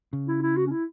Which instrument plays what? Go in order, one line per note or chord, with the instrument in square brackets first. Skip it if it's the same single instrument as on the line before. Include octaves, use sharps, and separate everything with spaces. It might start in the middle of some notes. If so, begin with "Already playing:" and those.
[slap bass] C#3
[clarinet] E4
E4
F#4
C#4
E4